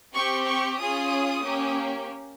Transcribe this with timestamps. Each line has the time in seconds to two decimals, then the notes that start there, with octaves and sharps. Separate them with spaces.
0.14 C4 G4 C#6
0.46 C#6
0.79 C#4 F4 G#4 D#6
1.43 A#3 C#4 G4